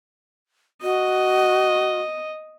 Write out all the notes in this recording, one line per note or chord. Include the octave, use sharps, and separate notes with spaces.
F#4 D#5